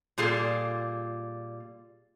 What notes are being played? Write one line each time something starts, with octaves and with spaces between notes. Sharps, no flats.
A#2 G3 F4 G#4 A4